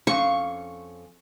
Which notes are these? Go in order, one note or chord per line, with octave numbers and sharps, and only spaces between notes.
F2 C#4 F5 C#6